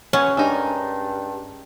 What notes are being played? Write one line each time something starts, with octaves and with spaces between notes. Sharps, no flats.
C#4 F#4 G#4 B4 C#5
G2 G#3 D4 D#4 A#4 C#5 E6